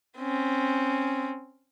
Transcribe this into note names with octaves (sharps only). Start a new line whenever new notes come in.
C4 C#4